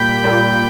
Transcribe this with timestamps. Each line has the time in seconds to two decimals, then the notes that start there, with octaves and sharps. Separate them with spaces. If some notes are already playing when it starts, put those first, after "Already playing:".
Already playing: A#2 G3 G5 B5
0.24 A#2 G3